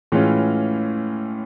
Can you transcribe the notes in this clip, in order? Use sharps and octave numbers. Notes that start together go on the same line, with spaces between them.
A2 E3 G#3 C#4 F4